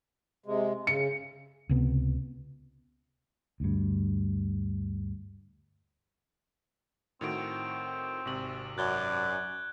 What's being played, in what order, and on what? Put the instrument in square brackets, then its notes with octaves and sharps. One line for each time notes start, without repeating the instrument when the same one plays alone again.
[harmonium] C3 G#3
[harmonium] C#3 [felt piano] C#7
[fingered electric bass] C#2 C3 B3
D2 G2
[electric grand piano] A2 D#3 F#4 [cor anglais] C4 [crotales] D7 F7
[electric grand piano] G#1 C3 [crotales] C#6 F#7
[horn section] F#2 [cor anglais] D5 [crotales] F#6 G#6 G7